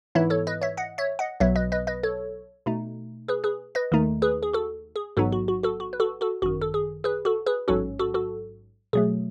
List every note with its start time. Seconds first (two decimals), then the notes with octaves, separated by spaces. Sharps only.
0.15 G#2 E3 B3 E4 C#5 E5
0.30 A4 C#5
0.47 B4 D#5
0.62 C#5 E5
0.77 D#5 F#5
0.98 C#5 E5
1.19 D#5 F#5
1.40 B1 B2 F#3 B3 C#5 E5
1.56 B4 D#5
1.72 B4 D#5
1.87 B4 D#5
2.03 A4 C#5
2.66 B2 A3 D#4
3.28 G#4 B4
3.44 G#4 B4
3.75 B4 D#5
3.92 D#2 D#3 A3 D#4
4.22 G#4 B4
4.43 G#4
4.53 F#4 A4
4.96 G#4
5.17 A1 G#2 F#3 B3 D#4 F#4 A4
5.32 F#4
5.48 F#4
5.63 F#4 A4
5.80 F#4
5.93 B4
6.00 F#4 A4
6.21 F#4 A4
6.42 G#1 F#2 D#3 F#4
6.61 A4
6.74 G#4
7.04 G#4 B4
7.25 F#4 A4
7.46 G#4 B4
7.68 A1 G#2 F#3 C#4 F#4 A4
7.99 F#4 A4
8.14 F#4 A4
8.93 B2 F#3 A3 G#4